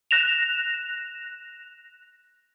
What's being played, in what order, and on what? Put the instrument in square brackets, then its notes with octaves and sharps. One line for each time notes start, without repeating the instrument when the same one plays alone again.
[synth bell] F#6 A#6 E7 F7